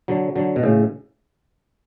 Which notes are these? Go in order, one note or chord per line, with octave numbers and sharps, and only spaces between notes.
D3 F#3
D3 F#3
B2
A2 C#3